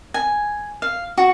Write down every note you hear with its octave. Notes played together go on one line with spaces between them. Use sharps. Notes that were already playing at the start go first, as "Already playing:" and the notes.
G#5
F5
F#4